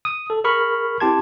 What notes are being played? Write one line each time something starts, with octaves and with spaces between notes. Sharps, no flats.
D#6
A4
G#4 A#4 B5 C#6 F6
C4 E4 G4 A5 C6 G#6